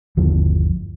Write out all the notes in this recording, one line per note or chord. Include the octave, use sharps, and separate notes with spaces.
G1 D#2 D3 F3